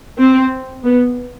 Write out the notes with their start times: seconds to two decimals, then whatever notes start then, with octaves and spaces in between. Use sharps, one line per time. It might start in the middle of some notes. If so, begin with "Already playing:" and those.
0.19 C4
0.83 B3